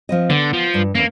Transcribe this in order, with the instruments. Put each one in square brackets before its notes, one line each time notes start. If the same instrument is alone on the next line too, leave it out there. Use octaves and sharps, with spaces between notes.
[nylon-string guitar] F3 C4 D#5
[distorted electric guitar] D3 [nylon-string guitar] B3
[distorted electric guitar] F3
[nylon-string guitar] G2
[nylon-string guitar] E2 C#4 [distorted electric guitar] A#3